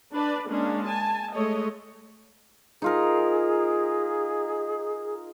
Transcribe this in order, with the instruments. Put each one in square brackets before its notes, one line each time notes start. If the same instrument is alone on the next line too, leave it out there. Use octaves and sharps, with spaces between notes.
[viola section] D4 B4 D5
G#3 A#3 C#4 D4
G#5 A5
G#3 A3 C#5 D#5
[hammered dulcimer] D#4 F4 A#4 [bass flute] G#4